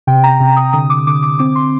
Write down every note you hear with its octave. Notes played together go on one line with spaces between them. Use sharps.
C3 G5
A#5
C3
D#6
D3 D#6
D6
D3 D6
D6
C4 D6
C6